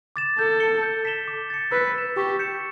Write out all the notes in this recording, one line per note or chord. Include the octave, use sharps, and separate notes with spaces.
D6 A6 E7
A4 G6
C#7 G7
G6
B6 E7 G7
D6
A6 C#7
B4 E6
B6 E7
G4 C#6
G6 C#7 E7